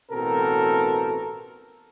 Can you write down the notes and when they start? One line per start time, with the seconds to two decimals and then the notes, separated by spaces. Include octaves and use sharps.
0.11 A1 B2 C4 A4 A#4